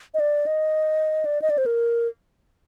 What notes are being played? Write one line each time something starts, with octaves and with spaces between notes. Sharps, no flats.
D#5
D5
D#5
D5
D#5
D5
C5
A#4